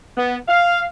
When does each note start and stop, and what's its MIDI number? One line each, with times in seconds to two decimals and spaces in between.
0.17 0.36 59
0.48 0.84 77